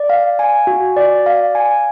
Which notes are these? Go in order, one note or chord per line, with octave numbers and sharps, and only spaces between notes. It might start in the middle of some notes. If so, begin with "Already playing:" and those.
Already playing: D5
F5
G#5
F#4
D5
F5
G#5